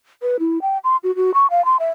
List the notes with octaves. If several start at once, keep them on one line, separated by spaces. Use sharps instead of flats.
B4
E4
G5
C6
F#4
F#4
C#6
F5
C6
E5